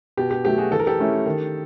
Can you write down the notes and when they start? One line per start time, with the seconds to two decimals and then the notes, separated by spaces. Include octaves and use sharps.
0.17 B2 G4
0.31 G4
0.45 F#3 A3 G4
0.58 F#4 G#4
0.71 E3 A4
0.79 A#4
0.87 G4 A4
0.99 A3 C#4 E4
1.25 D#3